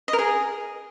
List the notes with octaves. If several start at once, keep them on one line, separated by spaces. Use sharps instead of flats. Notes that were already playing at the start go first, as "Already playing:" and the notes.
D#5
A#4
G#4